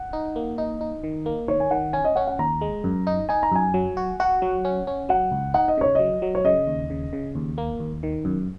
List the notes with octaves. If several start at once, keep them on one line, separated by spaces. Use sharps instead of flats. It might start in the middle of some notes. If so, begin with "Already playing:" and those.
Already playing: F#5
D#4
A#3
D#4 D#5
D#4
D#3
A#3
D#3 C#5
G#5
D#3 F#5
C#4 G#5
D#5
C#4 F#5
F#5
D#2 A#5
G#3
F#2
D#4
D#4 G#5
A#5
F#2 G#5
F#3
F#4
F#4 F#5
F#3
C#4
C#4
F#3 F#5
C#2
D#4 F#5
D#5
C#3 C#5
F#3 D#5
F#3
C#5
C#3 D#5
D#2
C#3
C#3
D#2
A#3
D#2
D#3
F#2